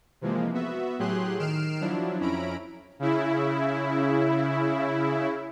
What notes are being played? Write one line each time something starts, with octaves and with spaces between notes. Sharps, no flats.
C3 E3 F3 G#3 A#3
B3 F#4 E5
A2 F#3 G4 G#4 C6 F#6
D#3 F6 C7 D7 E7
F3 F#3 D4 E4
F2 C#4 E4 A#5 B5 D7
C#3 E4